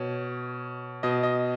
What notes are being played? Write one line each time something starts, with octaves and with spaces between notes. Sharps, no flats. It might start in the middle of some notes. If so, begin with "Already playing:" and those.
Already playing: B2 C#5
B2 D#5
D#5